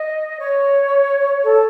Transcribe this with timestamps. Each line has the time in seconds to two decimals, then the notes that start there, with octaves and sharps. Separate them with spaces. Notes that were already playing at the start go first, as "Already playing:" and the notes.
Already playing: D#5
0.39 C#5
1.44 A4